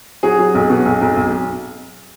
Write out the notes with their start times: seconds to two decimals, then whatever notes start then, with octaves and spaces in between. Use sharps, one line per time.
0.23 F#3 G#4
0.39 F#3
0.54 B1
0.70 B2
0.85 B1
1.01 B1
1.16 B1